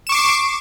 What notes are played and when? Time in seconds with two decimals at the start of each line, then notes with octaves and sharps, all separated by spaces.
0.07 E7
0.09 C#6
0.12 D6
0.15 C7